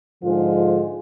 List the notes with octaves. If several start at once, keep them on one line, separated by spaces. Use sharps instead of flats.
G#2 D3 F3 G#3 F4